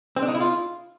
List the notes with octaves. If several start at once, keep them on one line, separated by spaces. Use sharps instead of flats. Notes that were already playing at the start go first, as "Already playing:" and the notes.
C4
D4
D#4
E4
F4